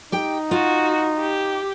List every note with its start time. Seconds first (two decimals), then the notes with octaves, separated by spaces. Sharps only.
0.12 D#4 G4 G5
0.51 F4 F#4
1.20 G4